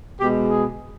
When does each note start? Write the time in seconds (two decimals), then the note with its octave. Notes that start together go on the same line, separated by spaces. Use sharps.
0.20 B2 G#3 G4
0.49 G#4